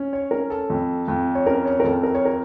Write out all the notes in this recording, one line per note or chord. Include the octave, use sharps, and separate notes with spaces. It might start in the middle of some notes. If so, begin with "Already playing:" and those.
Already playing: C#4
C#5
C#4 A#4
A4
F2
F2
C#5
C#4 A#4
C#5
A#4
F2 A4
A#4
C#5
A#4